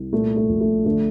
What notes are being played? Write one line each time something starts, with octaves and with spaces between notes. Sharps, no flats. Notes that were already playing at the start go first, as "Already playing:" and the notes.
Already playing: C2
A#2 A3
A3
A#1
A3
D3 A3